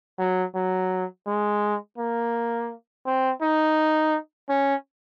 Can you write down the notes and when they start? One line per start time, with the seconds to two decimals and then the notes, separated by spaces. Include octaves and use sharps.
0.19 F#3
0.55 F#3
1.27 G#3
1.98 A#3
3.06 C4
3.42 D#4
4.49 C#4